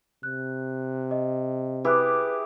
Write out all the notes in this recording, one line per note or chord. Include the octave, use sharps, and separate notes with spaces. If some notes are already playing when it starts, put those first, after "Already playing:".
C3 F#6
D#5
E4 G4 G#4 B4 D6 F#6